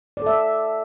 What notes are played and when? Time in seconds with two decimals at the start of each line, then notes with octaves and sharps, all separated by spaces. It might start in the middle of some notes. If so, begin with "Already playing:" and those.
0.17 D5
0.22 A4
0.26 E5